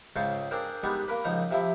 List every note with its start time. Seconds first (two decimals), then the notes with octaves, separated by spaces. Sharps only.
0.16 C#2 G#2 C#3 C5 A5 C#6
0.51 C4 D4 G#4 A#4 C5
0.83 G3 G#3 B3 D4 D#4
1.08 A#3 A#4 B4
1.24 C#2 F3 D#4 A#5
1.51 C3 F3 E4